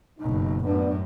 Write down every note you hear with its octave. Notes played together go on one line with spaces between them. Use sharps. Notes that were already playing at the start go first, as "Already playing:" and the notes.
F#1 B2 D#4
F#2 A2 B3 D4